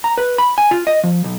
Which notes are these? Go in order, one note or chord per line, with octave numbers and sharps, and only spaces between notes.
A#5
B4
B5
G#5
F4
D#5
F3
B1